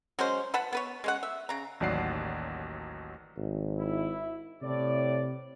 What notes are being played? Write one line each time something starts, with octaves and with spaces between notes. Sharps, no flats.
F#3 G#3 C#4 C5
B4 F#5 A5 B5
B3 B4 C#5
G#3 C#4 F#5
E5
C#3 A#5
A1 D#2 F#3 D5 F#5 C7
G#1
E4
A2 C3 D5